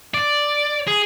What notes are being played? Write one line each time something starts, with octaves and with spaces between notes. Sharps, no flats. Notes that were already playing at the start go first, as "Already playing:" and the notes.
D5
G#4